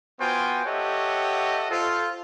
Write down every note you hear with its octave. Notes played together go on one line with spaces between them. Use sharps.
B3 F4 F#4 C5 G5 G#5
G4 A4 C#5 D#5 E5 F#5
F4 A4 C5